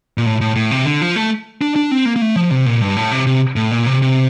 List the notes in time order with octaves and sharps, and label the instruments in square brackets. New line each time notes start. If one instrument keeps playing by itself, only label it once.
[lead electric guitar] A#2
A2
A2
A2
C3
D3
F3
A3
D4
D4
C4
A#3
A#3
A3
F3
C3
A#2
G2
A2
C3
C3
A2
A#2
C3
C3